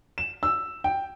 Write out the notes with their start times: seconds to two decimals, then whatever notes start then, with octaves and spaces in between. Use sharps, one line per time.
0.18 E7
0.43 E6
0.84 G5